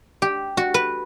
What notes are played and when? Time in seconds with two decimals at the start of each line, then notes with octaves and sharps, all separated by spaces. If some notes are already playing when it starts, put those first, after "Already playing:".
0.22 G4
0.57 F#4
0.74 B4